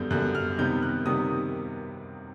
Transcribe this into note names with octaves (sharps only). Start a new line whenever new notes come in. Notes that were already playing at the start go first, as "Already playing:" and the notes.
Already playing: F#2 D3 G3 B3 G6
F#2 D3 G3 B3 F#6
F6
C3 D#3 G3 B3 G6
F#6
C3 D#3 G3 B3 D#6